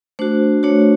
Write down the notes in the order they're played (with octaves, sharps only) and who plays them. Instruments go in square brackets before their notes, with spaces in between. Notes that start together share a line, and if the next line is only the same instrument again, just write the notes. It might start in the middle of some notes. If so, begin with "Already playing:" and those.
[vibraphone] A3 D4 F#4 C5
A3 D4 F#4 C#5